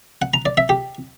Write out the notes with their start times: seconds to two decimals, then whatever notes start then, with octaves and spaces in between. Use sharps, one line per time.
0.22 F#5
0.34 A#5
0.46 D5
0.57 E5
0.69 G4